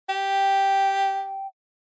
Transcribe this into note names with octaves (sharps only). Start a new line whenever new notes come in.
G4 G5